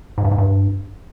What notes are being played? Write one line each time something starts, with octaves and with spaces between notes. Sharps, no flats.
G#2
G2
G#2
G2